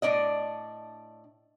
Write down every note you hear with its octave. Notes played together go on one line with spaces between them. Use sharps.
A2 D4 D5 D#5